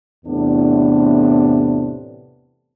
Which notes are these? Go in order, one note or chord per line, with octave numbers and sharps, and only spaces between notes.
E2 A2 C3 B3 D4